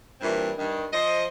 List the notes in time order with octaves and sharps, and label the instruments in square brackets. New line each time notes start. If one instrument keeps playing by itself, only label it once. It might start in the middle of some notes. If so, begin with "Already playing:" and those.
[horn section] G2 A#2 E3 C4
G2 D#3
F3 C5 D#5